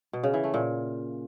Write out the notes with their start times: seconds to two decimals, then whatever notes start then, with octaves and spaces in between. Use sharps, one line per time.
0.13 B2
0.23 C#3
0.34 E3
0.44 A3
0.54 A#2